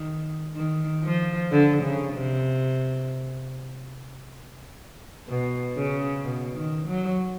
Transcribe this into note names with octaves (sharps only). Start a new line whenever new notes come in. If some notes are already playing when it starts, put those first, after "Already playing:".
Already playing: D#3
D#3
F3
D3
C#3
C3
B2
C#3
B2
D#3
F#3